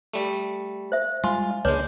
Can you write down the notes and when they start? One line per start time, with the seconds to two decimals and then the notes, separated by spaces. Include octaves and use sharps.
0.13 G3 A3
0.92 C5 E5
1.24 G3 G#3 F4 G#5 C6
1.65 C#2 C#3 G#3 A#3 D4 B4 C#5